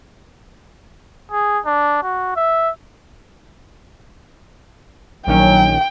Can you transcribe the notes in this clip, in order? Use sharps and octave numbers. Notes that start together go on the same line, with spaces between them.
G#4
D4
F#4
E5
A#1 D#3 F#3 C#4 G5